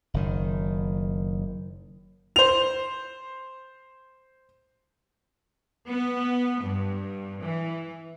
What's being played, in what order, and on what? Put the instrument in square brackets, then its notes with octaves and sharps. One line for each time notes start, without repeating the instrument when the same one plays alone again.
[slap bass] F#1 D#3
[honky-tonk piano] C5 F7
[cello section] B3
G2
E3